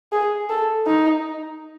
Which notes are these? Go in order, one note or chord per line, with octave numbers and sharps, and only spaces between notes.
G#4
A4
D#4